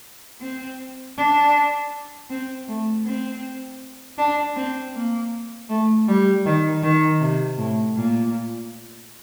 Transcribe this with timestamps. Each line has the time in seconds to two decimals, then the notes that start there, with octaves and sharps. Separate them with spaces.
0.42 C4
1.18 D4
2.30 C4
2.68 A3
3.06 C4
4.19 D4
4.56 C4
4.94 A#3
5.69 A3
6.08 G3
6.46 D#3
6.83 D#3
7.21 C3
7.58 A2
7.97 A#2